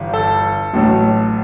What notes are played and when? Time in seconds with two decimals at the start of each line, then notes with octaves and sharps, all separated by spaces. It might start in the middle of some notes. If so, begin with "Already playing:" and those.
Already playing: G1 G2 E3
0.13 A4
0.73 A1 A2 F#3 A3